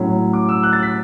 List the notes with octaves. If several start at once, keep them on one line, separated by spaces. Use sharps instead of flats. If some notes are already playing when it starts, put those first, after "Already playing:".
Already playing: A2 F#3 C#4
D6
E6
F#6
A6
B6